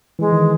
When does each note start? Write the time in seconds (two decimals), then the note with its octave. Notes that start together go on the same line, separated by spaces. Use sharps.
0.19 E3 G#3
0.32 D#3